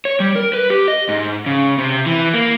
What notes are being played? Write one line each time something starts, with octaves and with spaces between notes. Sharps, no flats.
C#5
G3
A#4
B4
G4
D#5
G#2
C#3
C3
E3
A#3